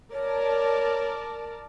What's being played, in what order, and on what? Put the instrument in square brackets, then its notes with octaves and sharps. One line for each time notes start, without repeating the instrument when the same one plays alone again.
[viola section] A#4 D5 A5 [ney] C#5